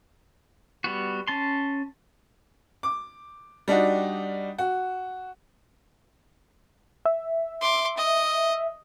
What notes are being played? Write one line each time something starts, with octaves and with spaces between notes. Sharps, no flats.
G3 B3 F#4
C#4 A5 C6
D6
G3 D4 D#4 F#4
F#4
E5
C6 D6
D#5